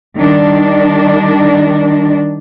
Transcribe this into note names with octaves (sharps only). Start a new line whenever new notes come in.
D#3 G3 D4